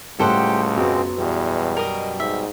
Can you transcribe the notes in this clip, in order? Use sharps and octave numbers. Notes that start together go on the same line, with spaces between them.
C#2 A2 G3 G4 A4 C5 F#5 G5
F#2 B2 F#3 G#3 B3 C4
E2 B2 G3
A#4 D#5
G#2 E5